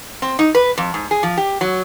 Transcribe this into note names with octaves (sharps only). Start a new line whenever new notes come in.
C4
D#4
B4
F2
G#2
G#4
F3
G4
F#3